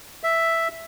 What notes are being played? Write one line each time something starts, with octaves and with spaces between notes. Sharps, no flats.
E5